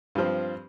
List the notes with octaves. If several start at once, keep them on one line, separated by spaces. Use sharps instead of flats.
G2 F3 C4